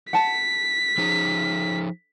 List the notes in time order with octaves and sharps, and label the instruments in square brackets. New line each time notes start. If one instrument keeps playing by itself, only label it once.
[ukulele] F#5 A5 [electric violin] B6
[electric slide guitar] F3 D#4 G#4